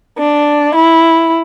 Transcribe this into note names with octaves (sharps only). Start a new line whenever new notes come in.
D4
E4